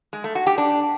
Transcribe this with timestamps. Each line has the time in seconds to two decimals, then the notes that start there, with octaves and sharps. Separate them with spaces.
0.13 G#3
0.24 A3
0.35 F#4
0.47 G4
0.58 D4